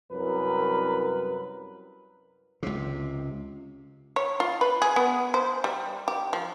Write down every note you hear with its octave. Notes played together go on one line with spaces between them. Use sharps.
C2 F#2 A#4 B4
C#2 C3
C#5
F4
B4
G#4
B3
C5
G3
G4
F3